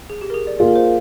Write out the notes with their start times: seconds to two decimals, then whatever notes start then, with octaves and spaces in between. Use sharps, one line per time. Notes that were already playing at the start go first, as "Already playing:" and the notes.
0.10 G#4
0.21 G4
0.30 A#4
0.34 G#4
0.47 D5
0.59 A#3 F4 G#4 D5
0.68 A#4
0.75 C5